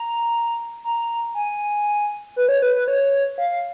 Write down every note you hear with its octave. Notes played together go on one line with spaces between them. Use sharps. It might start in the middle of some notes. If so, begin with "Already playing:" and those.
Already playing: A#5
A#5
G#5
B4
C#5
B4
B4
C#5
F5
F5